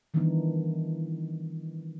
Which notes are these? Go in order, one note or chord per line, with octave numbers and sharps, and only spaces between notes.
D#3 E3 G3 B3 D4 D#4